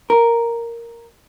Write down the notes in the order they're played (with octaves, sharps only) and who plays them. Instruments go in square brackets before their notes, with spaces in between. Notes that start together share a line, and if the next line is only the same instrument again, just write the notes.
[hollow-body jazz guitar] A#4